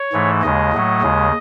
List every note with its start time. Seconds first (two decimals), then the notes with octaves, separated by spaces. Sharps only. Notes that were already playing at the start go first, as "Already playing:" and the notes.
Already playing: C#5
0.13 G#2 E3 A3
0.43 D#2 C#3 G#3 D#5
0.73 A2 F#3 A3
1.02 D#2 C#3 G#3